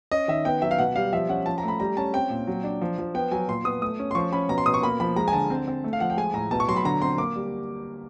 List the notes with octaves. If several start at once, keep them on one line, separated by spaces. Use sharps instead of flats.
C#4 D#5
D#3 E5
B3 G5
F#3 E5
F5
B2 F#5
G3 F5
F3 E5
C#4 F#5
F3 A5
A#5
A3 B5
G3 A#5
C#4 A5
C4 G5
A#2
F#3
D4
F3
F3
B3 G5
F#3 G#5
A#2 C6
B3 D#6
A3 D#6
C#4
C6
F3 C#6
C#4 B5
B2 A#5
C6
B2 D#6
C#6
A#3 B5
F3 B5
G#3 A#5
G#5
D3 A5
C4
C4
A3
F5
F3 F#5
G5
G#3 G#5
A2 A#5
B2 A5
C#6
F#3 C6
B5
D3 A#5
C4 C6
A#3 D6
G3